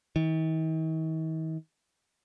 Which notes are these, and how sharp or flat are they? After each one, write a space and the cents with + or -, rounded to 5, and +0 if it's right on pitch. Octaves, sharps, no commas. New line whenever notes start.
D#3 +45